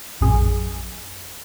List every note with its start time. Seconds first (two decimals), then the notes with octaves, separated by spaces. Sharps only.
0.21 A#1 F#2 G#4